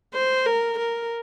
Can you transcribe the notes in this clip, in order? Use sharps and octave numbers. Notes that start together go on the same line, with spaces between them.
C5
A#4
A#4